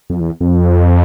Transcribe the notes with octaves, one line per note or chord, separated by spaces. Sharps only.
F2
E2
F2